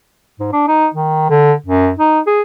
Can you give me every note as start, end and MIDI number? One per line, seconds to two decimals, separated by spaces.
0.40 0.50 44
0.52 0.64 62
0.68 0.88 63
0.94 1.27 51
1.30 1.53 50
1.66 1.91 42
1.99 2.20 63
2.27 2.42 68